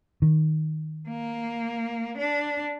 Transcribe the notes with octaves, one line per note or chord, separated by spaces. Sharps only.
D#3
A#3
D4